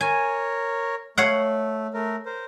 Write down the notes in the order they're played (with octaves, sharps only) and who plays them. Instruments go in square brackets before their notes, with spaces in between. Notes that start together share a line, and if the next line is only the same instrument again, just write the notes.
[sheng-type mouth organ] A#4 C#5 [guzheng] G#5
[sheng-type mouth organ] A3 [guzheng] C#5 F5 F#5
[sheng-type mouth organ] A3 A#4
A#4 C5